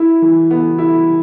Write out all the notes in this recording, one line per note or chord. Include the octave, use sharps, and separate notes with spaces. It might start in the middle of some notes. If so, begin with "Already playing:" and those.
Already playing: E4
E3
B3
E4